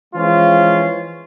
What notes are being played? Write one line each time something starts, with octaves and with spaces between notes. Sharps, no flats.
E3 F3 G#3 C#4 F4